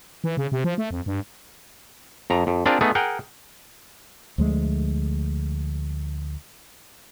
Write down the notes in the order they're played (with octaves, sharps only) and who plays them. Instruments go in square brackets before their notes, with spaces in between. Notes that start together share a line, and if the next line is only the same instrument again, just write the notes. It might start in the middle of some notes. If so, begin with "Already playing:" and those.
[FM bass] E3
C#3
C3
F3
A3
F2
G2
[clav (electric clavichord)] F2 A#5
F2
C4 D4 F4 G#4 A#4 D5
A3 B3 D#4 G#4
G#4 A#4 F#5 G5
[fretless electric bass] D2 F3 G#3 A3